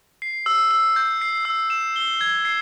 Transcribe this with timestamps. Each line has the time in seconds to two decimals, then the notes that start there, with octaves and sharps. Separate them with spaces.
0.22 C7
0.46 E6
0.71 E6
0.96 G6
1.21 C7
1.45 E6
1.70 E7
1.96 G7
2.21 G#6
2.45 C7